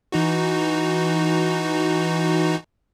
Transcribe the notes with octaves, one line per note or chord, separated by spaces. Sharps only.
E3 D#4 F#4